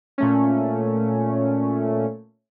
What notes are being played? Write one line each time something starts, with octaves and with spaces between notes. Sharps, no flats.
A#2 A3 C#4